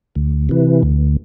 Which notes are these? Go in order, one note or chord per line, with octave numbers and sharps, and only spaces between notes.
D2
C3 E3
D2